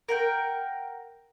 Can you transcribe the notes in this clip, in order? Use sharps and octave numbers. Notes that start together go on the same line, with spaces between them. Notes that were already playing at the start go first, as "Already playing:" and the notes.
A#4 F#5 G5